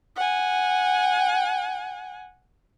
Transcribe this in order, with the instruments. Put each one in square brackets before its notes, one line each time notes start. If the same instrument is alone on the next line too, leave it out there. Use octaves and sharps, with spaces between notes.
[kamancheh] F#5 G#5